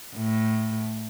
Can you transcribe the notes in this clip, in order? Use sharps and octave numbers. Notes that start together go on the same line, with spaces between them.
A2